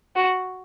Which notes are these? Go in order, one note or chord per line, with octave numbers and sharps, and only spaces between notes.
F#4